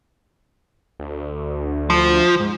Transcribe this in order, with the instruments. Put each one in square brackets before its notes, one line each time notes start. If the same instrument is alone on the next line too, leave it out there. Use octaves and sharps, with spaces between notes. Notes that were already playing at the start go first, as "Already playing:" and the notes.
[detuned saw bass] D2
[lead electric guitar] F3
[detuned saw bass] G#2